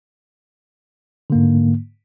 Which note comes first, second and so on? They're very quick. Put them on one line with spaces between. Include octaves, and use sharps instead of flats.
D3 A#3 G#2